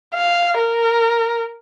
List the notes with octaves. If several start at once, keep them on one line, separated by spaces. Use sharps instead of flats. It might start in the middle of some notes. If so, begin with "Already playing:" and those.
F5
A#4